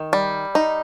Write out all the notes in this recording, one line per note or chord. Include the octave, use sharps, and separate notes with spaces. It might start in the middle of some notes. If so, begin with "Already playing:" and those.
Already playing: D#3
G3
D#4